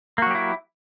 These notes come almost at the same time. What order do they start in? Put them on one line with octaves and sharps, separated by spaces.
A#3 F#4 F#3 G4 E4